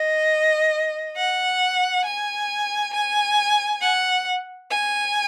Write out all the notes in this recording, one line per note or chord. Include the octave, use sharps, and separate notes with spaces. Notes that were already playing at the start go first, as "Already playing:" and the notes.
Already playing: D#5
F#5
G#5
G#5
F#5
G#5